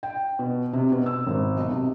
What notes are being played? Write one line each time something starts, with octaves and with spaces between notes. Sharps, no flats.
G5
B2
C3
B2
E6
G#1
B1
C3